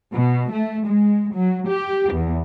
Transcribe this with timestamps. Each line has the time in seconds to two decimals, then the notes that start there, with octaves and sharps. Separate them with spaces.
0.12 B2
0.51 A3
0.88 G#3
1.35 F#3
1.67 G4
2.13 E2